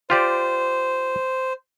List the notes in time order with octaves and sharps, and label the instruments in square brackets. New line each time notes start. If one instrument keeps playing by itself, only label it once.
[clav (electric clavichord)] F4 G4 D5 [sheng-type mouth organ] C5